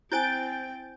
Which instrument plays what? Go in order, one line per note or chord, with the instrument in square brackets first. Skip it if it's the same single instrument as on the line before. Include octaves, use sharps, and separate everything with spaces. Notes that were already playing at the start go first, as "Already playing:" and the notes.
[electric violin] C4 G5 [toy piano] E4 C5 G#5 [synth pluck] G6 A6 D7